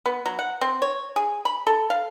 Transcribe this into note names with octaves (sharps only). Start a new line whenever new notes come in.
B3
F#3
F#5
C4
C#5
G#4
B5
A4
F5